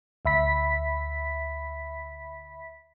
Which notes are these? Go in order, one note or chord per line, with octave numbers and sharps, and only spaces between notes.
D2 E5 B5 B6